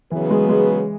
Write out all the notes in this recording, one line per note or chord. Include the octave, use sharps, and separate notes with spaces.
C#3 E3 F#3 B3 G#4 B4
G#3
G#3